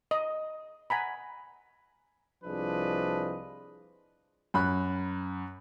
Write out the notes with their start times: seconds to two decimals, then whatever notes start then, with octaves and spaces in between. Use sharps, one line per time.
0.11 D#5
0.90 F#5 G#5 A#5 B5
2.44 C2 F3 D4 G#4 B4 D#5
4.54 F#2 B5 F#6